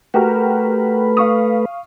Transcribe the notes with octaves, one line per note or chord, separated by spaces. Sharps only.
A3 F#4 G4 A#4 B4
F5 C#6 D#6